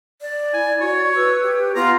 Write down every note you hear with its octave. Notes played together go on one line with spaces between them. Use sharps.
D5
E4 G#5
F#4 C#5
B4 E6
G4
B3 F4 A#5